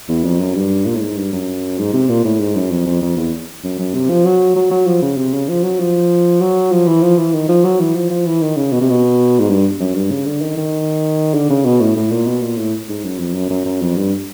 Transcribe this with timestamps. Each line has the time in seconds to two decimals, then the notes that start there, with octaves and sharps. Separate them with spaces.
0.09 E2
0.24 F2
0.40 F#2
0.55 G2
0.86 A#2
0.96 A2
1.01 G#2
1.17 G2
1.32 F#2
1.79 G#2
1.93 C3
2.09 A#2
2.25 A2
2.40 G#2
2.55 F#2
2.71 F2
2.86 F2
3.02 F2
3.17 E2
3.64 F#2
3.79 F#2
3.94 C3
4.10 F3
4.25 F#3
4.56 F#3
4.71 F#3
4.87 F3
5.02 C#3
5.17 C3
5.33 C#3
5.48 F3
5.63 F#3
5.79 F3
6.41 F#3
6.71 F3
6.87 E3
7.02 F3
7.18 E3
7.33 D#3
7.49 F3
7.64 F#3
7.80 E3
7.95 F3
8.10 F3
8.26 E3
8.41 D#3
8.56 C#3
8.72 B2
8.81 C3
8.90 B2
9.39 G#2
9.49 G2
9.80 F#2
9.95 G2
10.11 C#3
10.26 D3
10.41 D#3
10.57 D#3
11.34 D3
11.50 C#3
11.65 B2
11.80 A2
11.96 A2
12.11 A#2
12.27 B2
12.42 A#2
12.58 A2
12.89 G#2
13.03 F#2
13.19 F2
13.34 F#2
13.50 F#2
13.65 F#2
13.81 F2
13.96 G2